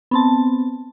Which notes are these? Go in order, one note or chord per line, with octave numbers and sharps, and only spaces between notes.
B3 C4 A5